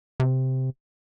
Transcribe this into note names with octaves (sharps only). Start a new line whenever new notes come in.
C3